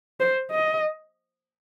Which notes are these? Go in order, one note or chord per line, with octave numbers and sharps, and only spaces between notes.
C5
D#5